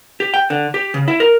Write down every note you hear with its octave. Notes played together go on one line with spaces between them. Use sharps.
G4
G5
D3
G4
C#3
E4
A#4